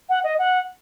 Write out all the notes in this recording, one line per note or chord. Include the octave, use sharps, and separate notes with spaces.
F#5
D#5
F#5